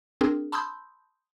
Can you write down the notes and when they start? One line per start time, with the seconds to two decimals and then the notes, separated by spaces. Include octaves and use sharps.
0.21 C4 D4 G#4 A#4
0.52 A5 B5 C6 D#6 E6 G6